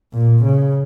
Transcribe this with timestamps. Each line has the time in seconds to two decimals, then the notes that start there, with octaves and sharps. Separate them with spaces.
0.13 A#2
0.44 C#3